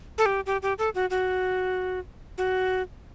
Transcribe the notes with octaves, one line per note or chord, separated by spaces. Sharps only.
A4
G4
G4
G4
A4
F#4
F#4
F#4